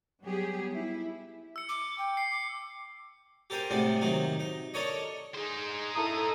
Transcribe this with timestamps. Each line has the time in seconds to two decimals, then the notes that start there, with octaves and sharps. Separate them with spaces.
0.23 F#3 G3 B3 G4 G#4
0.72 E4
1.56 E6 C#7
1.69 D6
1.98 G5
2.17 C7
2.31 D6
3.50 G4 A4 A#4 C5 G5 G#5
3.70 A2 C3 G3 G#3 B3 D4
4.01 C3 D#3 F#3 D#4
4.40 D#4
4.74 D4 A4 A#4 C#5 D#5
5.35 D#4 G#4 C5
5.95 E4 A4 A5 A#5 D#6